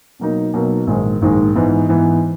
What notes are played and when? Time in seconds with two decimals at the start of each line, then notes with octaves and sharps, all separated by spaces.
0.19 B2 F#3 A#3 D#4
0.54 B2 F#3 A#3 D#4
0.87 A#1 G#2 D#3 G#3
1.22 A#1 G#2 D#3 G#3
1.55 G#2 E3 B3
1.89 G#2 E3 B3